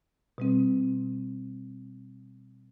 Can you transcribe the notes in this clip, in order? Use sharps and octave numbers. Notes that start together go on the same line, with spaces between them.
B2 G3 C4